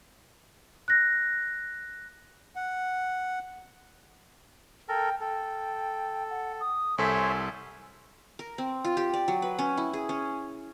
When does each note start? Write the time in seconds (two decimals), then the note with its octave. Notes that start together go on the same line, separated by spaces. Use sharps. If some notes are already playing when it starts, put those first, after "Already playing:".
0.88 F#6 A#6
2.56 F#5
4.89 A4 A#4 G5
5.21 A4 G5
6.30 F#5
6.60 D#6
6.98 C2 A4 C5 C#5 E5 G#5 B6
8.39 A#4
8.58 C4
8.85 F4
8.97 G4
9.14 D5
9.28 F#3
9.42 B4
9.59 C#4
9.77 E4
9.93 G#4
10.09 C#4